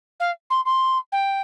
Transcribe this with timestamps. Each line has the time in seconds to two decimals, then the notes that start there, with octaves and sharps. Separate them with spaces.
0.20 F5
0.50 C6
0.66 C6
1.12 G5